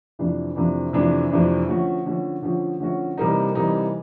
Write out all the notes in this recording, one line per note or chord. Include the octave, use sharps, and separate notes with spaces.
F2 C3 E3 A3 D4
F2 C3 E3 A3 D4
F2 C3 E3 A3 D4
F2 C3 E3 A3 D4
D3 F3 A3 C#4 F#4
D3 F3 A3 C#4 F#4
D3 F3 A3 C#4 F#4
D3 F3 A3 C#4 F#4
C3 E3 G3 A#3 D#4
C3 E3 G3 A#3 D#4